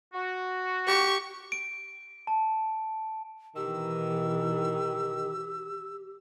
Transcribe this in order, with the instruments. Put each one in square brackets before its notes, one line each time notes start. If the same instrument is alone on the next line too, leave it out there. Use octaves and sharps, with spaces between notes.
[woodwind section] F#4
[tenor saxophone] G4 [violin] C#6
[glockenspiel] D7
A5
[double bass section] B2 E3 [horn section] D#3 [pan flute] G4 [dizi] E6